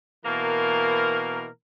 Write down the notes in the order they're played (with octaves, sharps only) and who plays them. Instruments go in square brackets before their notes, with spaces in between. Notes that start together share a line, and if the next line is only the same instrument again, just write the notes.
[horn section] B2 E3 A#3 A#4